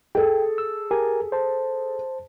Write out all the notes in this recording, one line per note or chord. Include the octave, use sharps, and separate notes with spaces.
G#4 A4 G5
E6
G4 A#4 G#5
C5 A5